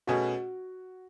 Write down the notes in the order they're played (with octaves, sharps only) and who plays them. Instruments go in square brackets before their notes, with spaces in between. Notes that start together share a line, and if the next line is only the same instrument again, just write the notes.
[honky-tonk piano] B2 A3 C#4 G#4 [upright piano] F#4